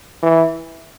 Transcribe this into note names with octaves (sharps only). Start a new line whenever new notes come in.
E3